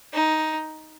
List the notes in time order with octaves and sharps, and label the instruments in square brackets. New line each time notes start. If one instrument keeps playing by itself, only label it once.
[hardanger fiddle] D#4